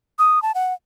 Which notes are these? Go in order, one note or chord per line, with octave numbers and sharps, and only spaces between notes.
D#6
A5
F#5